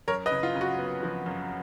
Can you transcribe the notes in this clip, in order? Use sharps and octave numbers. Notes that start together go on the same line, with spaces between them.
F#2 A#4 C#5
B4 D#5
C#3
F4
C#3
F#4
B3
F3
F#2